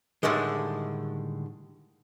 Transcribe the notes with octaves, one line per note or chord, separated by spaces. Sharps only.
A2 D3 D#3 G3 G#3